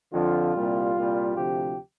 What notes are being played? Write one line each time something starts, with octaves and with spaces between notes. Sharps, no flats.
F2 D3 F3 F4
C2 A#2 G3
C2 A#2 G3
D2 C3 F3 G4